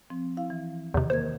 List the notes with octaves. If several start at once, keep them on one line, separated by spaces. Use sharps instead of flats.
F3 C4
E4 F5
E3
E2 C3 D#3
A#3 A#4 C5 G#6